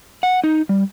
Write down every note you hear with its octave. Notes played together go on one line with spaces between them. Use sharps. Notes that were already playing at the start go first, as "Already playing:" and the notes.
F#5
D#4
G3